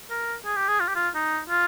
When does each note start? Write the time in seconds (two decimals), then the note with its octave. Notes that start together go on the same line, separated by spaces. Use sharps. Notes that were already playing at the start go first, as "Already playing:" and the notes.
0.10 A#4
0.45 G#4
0.56 G4
0.68 G#4
0.80 F4
0.88 G4
0.95 F4
1.15 D#4
1.49 F4